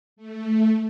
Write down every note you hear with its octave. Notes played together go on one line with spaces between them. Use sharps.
A3